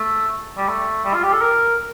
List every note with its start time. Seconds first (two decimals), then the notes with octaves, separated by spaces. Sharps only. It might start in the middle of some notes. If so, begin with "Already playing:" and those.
Already playing: A3
0.57 G3
0.68 A3
1.05 G3
1.14 F4
1.23 G4
1.33 A4
1.42 A#4